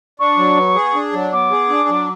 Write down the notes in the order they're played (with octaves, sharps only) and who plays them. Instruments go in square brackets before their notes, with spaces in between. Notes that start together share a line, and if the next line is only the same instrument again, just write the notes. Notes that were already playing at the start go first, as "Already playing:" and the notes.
[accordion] D4 [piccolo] C#6
[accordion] F#3
B3
G#4
D4
F#3
[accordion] B3 [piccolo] D6
[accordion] G#4
D4
F#3